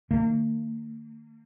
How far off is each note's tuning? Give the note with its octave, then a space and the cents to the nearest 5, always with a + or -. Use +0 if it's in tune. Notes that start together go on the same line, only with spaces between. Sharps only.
D#3 -30 A#3 -40